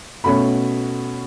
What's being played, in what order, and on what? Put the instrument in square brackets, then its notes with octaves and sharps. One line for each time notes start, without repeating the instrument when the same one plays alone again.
[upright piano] B2 A3 C#4 B5